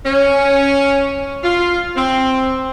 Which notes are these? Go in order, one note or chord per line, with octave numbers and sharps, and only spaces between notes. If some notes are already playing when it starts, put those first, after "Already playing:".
C#4
F4
C4